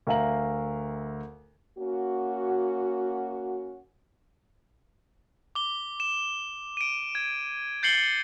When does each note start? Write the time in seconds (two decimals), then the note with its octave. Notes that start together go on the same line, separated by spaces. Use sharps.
0.07 D2 A#4 E5 F5 A#5 F#7
1.77 A#3 C#4 F#4
5.55 D6 G7
6.00 E7
6.77 D7 D#7
7.15 G#6
7.83 G6 A6 C7 C#7 F#7 G7